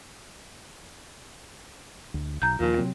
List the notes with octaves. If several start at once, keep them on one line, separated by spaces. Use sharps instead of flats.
D2
B1 A#5 G6
D#2 A#2 F3
C3 F#3 C4